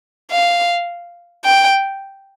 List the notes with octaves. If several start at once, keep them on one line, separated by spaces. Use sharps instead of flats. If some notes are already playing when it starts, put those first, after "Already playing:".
F5
G5